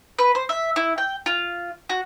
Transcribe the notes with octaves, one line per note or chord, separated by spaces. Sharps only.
B4
C5
E5
E4
G5
F4
F#4